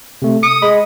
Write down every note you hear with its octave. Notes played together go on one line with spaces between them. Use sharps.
C3 A3
D#6 C#7
G#3 B5